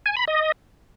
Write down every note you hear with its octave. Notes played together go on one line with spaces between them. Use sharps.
G#5
B5
D#5